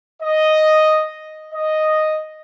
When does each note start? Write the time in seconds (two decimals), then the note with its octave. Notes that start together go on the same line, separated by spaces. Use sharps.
0.22 D#5
1.53 D#5